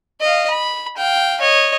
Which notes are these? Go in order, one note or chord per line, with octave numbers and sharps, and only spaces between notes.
D#5 F5
B5
F5 G5
C#5 D#5